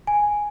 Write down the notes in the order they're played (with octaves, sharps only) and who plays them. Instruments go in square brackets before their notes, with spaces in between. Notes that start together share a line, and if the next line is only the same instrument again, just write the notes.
[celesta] G#5